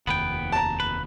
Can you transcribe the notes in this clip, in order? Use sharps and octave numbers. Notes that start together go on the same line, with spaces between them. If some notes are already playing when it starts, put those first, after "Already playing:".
F1 D#2 B3 B4 G5
A5 A#5
B4